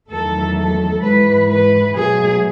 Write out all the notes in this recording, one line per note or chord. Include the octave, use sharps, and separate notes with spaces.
E2 D#3 F#3 A3 A4
A4
G#2 E3 G#3 B4
B4
B2 F#3 A3 G#4